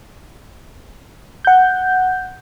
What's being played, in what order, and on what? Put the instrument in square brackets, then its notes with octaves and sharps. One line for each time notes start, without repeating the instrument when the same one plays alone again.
[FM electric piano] F#5 G6